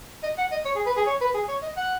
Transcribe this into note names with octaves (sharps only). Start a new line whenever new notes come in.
D#5
F#5
D#5
C#5
G#4
B4
G#4
C#5
B4
G#4
C#5
D#5
F#5